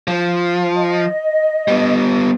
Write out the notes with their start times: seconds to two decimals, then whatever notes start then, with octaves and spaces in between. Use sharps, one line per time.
0.08 F3
0.75 D#5
1.68 G3 B3